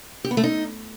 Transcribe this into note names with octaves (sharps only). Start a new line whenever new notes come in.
G4
B3
A3
D#4